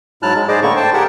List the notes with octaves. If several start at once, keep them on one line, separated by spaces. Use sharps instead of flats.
G#2 F#3 E4 A5 F6 F#6
G#3
G#2 G#4 C5 D5 D#5 D6
A2 D3 A#3 E4 C#6
C5 G5 A5
G4 G#4 A#4 F#5